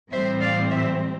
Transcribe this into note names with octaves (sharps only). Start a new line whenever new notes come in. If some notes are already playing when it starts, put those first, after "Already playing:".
A2 E3 G3 C4 C5 E5
D5 F5
C5 E5